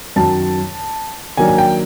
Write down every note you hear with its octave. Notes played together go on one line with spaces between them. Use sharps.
F#2 D#3 F#3 A5
D#3 F#3 A#3 D4 G#5
G#5
G5